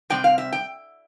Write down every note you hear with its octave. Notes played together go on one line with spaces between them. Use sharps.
C3 G3 C4 G5
F5
E5
G5